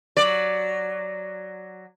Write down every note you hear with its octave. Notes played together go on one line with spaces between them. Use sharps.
F#3 D5